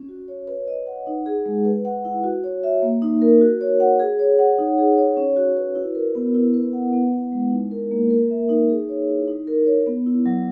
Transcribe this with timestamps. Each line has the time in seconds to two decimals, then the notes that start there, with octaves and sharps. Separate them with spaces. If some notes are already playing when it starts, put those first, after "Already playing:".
Already playing: C#4
0.09 F#4
0.28 C#5
0.48 B4
0.68 D#5
0.87 F#5
1.07 D#4
1.26 G#4
1.46 G#3
1.65 B4
1.85 F#5
2.05 E4
2.24 F#4
2.44 C#5
2.64 E5
2.83 A#3
3.02 D#4
3.22 A#4
3.41 F#4
3.61 C#5
3.80 F#5
4.00 G#4
4.19 C#5
4.39 F#5
4.58 D#4
4.78 G#4
4.97 C#5
5.17 C#4
5.36 F#4
5.57 B4
5.75 E4
5.95 A#4
6.15 B3
6.34 E4
6.54 B4
6.73 F#5
6.93 B3
7.13 E4
7.32 G#3
7.51 D#4
7.71 A#4
7.91 A#3
8.10 A#4
8.30 E5
8.49 D#4
8.69 G#4
8.89 C#5
9.08 E4
9.28 D#4
9.47 A#4
9.66 C#5
9.86 B3
10.06 E4
10.26 F#3